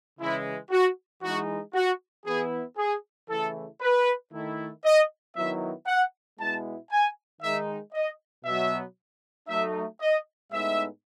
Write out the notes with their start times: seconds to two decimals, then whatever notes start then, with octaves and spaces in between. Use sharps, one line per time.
0.20 C#3 E3 G#3 E4
0.71 F#4
1.23 E3 G#3 D#4 F#4
1.75 F#4
2.26 E3 B3 E4 G#4
2.78 G#4
3.30 C#3 E3 A3 E4 A4
3.81 B4
4.33 D#3 A3 E4
4.85 D#5
5.36 D#3 F#3 B3 E4 E5
5.87 F#5
6.39 B2 G#3 B3 E4 A5
6.91 G#5
7.42 D#3 G#3 D#4 E5
7.93 D#5
8.45 B2 F#3 B3 E5
9.48 F#3 A3 D#4 E5
10.01 D#5
10.52 A2 G#3 B3 D#4 E5